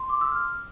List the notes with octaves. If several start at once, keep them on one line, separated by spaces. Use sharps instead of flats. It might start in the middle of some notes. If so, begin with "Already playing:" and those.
Already playing: C6
D6
E6
F6